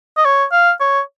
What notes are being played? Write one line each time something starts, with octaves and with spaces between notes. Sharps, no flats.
D#5
C#5
F5
C#5